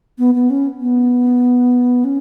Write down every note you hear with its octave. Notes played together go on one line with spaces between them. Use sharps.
B3
B3
C#4
B3
C#4